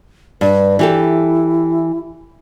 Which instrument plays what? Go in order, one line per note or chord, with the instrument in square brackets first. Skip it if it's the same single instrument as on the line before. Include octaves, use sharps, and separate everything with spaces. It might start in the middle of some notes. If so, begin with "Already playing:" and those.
[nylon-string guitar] G2 [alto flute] B4
[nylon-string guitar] E3 G4 A4 [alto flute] E4